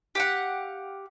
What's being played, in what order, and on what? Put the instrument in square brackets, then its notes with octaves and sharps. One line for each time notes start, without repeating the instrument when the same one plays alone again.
[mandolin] G4 F5 F#5